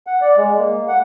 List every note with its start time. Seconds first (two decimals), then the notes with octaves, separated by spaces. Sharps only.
0.07 F#5
0.21 D5
0.37 G#3
0.58 A#3
0.88 F#5